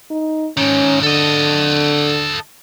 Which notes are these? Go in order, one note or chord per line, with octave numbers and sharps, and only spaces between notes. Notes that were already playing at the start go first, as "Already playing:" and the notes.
D#4
G#2 D#3 C#4
D3 A4 D#5